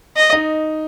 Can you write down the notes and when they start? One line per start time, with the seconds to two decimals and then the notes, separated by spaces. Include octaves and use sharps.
0.16 D#5
0.33 D#4